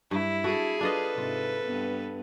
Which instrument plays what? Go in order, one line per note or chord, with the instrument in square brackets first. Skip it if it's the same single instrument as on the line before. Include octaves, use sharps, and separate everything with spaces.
[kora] G2 [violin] E4
[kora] F#4 A4 [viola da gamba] G#4
[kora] D4 F4 D#5 [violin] A4 B4
[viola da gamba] G#2 C3 [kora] F4
[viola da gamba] G2 B3